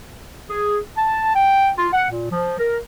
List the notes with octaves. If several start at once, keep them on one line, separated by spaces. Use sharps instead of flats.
G#4
A5
G5
F4
F#5
A#2
F3
A#4